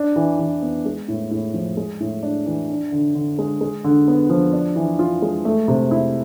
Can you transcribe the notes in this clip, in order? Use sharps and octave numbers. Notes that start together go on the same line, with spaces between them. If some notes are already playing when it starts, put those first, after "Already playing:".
Already playing: D4
E3
E3
B3
G#3
A2
A2
F3
G#3
A2
D4
E3
D4
D3
D3
G#3
G#3
D3
B3
F3
D4
E3
F4
G#3
A3
C3
E4